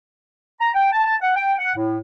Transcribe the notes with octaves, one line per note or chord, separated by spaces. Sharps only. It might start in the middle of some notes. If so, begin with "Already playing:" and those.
A#5
G5
A5
A5
F#5
G5
F#5
A2